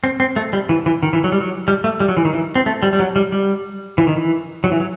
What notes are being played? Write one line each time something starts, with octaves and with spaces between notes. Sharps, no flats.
C4
C4
A3
G3
E3
E3
D#3
E3
F#3
G3
F#3
G3
A3
G3
F#3
E3
D#3
E3
C4
A3
G3
G3
F#3
G3
G3
E3
D#3
E3
F#3
E3
F#3